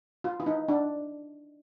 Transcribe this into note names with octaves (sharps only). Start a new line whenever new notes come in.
F4
E4
D#4
D4